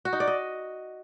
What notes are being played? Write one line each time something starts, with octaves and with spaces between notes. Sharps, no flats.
F#4
D#4
D5
D#5